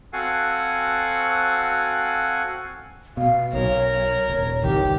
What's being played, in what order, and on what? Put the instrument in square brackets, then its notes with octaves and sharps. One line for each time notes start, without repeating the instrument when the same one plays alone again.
[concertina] C4 F#4 A4 F5 F#5 G#5
[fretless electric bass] B2 [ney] F5
[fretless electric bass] B1 [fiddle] A#4 [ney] C#5
[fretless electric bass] D#1
[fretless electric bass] G1 C2 D#3 [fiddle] G4